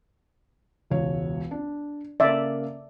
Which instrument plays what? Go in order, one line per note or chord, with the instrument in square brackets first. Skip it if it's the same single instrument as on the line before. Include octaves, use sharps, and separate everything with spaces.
[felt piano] E1 C#2 C#5
D4
[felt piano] C#3 A#3 [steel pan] D5 E5